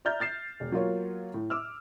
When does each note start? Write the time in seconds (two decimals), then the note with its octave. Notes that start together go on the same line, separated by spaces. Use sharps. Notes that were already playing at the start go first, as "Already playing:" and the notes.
0.05 D5 E5 A#5 F6 G6 A6
0.20 F6 A6 C7 E7
0.60 E1
0.72 F#3 A#3 F4 C#5
1.34 A2
1.50 D6 E6 F6